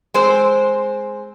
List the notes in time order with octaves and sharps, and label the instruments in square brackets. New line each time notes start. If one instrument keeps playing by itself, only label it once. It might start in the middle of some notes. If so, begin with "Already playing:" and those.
[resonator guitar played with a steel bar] G#3 C4 C5